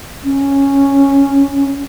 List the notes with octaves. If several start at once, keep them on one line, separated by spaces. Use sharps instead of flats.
C#4